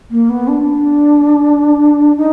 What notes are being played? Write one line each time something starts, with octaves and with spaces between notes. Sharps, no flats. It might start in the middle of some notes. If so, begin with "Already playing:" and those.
A#3
B3
D4
D#4